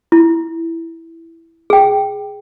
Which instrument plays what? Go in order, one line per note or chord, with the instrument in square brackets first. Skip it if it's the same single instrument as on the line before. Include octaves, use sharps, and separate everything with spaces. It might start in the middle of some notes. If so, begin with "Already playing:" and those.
[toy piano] E4
G#4 G5